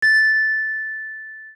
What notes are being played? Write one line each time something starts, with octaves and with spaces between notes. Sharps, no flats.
A6